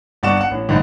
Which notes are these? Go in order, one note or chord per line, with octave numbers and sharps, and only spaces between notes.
G1 G2 D5 F#5 C#6 E7
F#5 E7
A1
A#1 G#2 D#3